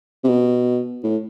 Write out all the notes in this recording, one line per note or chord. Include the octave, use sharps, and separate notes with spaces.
C3
B2
A2